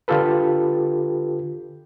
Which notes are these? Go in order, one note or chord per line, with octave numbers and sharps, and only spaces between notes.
D3 F4 G4 A4 B4